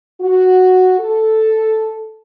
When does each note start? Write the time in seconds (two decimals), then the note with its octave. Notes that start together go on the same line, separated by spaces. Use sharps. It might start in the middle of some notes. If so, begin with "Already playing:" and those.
0.21 F#4
1.00 A4